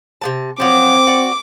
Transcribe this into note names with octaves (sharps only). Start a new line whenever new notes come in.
C3 B3 A5
F3 F#3 C4 D6
F#4 D5